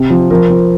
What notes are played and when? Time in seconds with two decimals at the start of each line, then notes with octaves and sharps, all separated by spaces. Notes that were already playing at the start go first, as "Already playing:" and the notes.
Already playing: C3
0.10 F3
0.30 F3 A#4
0.50 F3